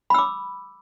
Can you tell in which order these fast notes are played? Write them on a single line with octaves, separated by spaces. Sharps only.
B5 E6 D6